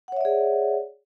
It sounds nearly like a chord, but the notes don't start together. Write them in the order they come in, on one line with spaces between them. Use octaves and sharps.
F#5 C#5 E5 D5 G#4